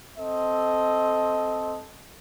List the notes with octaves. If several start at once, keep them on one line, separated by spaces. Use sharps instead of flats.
C4 A4 D#5